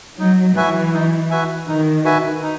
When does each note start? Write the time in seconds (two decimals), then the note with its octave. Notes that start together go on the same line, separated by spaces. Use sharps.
0.20 F#3 D#4
0.56 E3 F#4 B4 E5 G#5
0.93 D#4
1.31 F#4 B4 E5 G#5
1.68 D#3 D#4
2.04 F#4 B4 E5 G#5
2.43 D#4